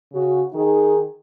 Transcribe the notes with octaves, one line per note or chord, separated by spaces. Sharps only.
C#3 F#4
D#3 D#4 G#4